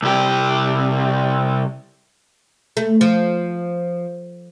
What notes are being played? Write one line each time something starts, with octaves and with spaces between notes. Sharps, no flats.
C2 G4
A3
F3